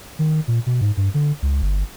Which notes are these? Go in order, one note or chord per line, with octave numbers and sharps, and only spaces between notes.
D#3
A#2
B2
G#2
G2
D3
C#2
G1